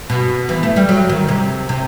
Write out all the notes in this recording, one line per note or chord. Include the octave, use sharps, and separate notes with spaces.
B2
E3
A3
G3
F#3
D#3
C3
C3